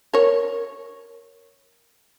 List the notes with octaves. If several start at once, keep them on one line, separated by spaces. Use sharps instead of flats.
A#4 C#5